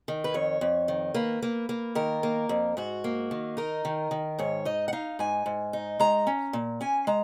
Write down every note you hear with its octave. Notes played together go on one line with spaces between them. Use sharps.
D#3
B4
F2 C#5
F2
D#3
A#3 B4
A#3
A#3
D#3 A#4
A#3
F2
G#2 F#4
A#3
D#3
D#4 A#4
D#3
D#3
G#2 C#5
D#4 D#5
F#5
D#4 F5
G#2 G#5
G#2
D#4
G#3 A#5
C#4
A#2
C#4 G#5
G#3 A#5